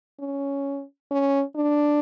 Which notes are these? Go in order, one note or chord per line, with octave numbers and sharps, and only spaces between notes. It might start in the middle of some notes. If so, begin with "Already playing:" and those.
C#4
C#4
D4